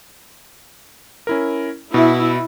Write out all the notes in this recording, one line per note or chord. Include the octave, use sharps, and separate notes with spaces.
C#4 E4 A#4
B2 E4